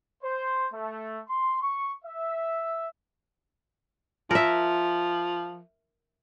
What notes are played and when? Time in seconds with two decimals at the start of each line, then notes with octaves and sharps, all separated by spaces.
0.23 C5
0.73 A3
1.29 C6
1.61 C#6
2.05 E5
4.31 F3 A#4 E5